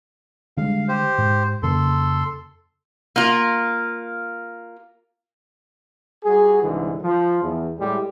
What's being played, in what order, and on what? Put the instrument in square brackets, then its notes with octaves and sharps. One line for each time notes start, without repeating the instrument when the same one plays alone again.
[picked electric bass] D3 G3 G#3 [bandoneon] F5
[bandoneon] G4 C5
[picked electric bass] G#2
[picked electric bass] F2 C#3 A#3 [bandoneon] A4 C6
[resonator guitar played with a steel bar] A#3 F4
[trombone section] G3 F#4 G#4
C2 G#2 D3 E3
F3
E2
A2 G3 G#3 G4